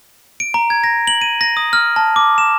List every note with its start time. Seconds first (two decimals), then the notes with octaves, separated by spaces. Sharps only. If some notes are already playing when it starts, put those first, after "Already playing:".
0.40 D7
0.54 A#5
0.70 G#6
0.84 A#6
1.07 F#7
1.22 D#7
1.41 A#6
1.57 D#6
1.73 F6
1.96 A5
2.16 D6
2.38 E7